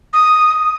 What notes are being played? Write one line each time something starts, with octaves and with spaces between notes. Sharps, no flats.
D#6